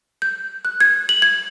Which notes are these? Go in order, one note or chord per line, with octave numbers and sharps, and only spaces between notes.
G6
F#6
G#6
F#7
G#6